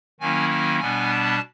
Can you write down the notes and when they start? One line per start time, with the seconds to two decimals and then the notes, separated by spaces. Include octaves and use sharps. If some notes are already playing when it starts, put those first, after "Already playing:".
0.20 D#3 F#3 A#3 C#4 E4 G#5
0.50 G#5
0.80 B2 G3 B3 D4 G#5
1.10 A5